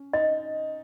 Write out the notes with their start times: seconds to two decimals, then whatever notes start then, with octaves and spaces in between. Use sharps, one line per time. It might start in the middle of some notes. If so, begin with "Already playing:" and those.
Already playing: C#4
0.13 D#4 D#5